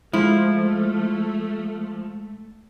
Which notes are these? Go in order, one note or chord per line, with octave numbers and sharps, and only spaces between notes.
F3 G#3 A3 E4